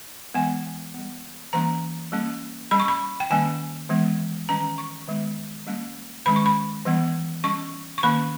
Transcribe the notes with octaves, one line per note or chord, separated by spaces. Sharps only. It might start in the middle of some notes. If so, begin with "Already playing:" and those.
E3 G#3 B3 G#5
G3 B3
E3 G3 A#3 C#4 A#5
G3 A#3 C#4
G3 C#4 B5
C#6
B5
G5
D#3 G3 A#3 C#4 G#5
E3 G#3 B3
D#3 G3 C#4 A#5
C#6
D#3 G#3 B3
G3 A#3 C#4
D#3 G#3 C#4 B5
C#6
B5
E3 G3 B3
G3 C#4 C#6
C#6
D#3 A#3 C#4 B5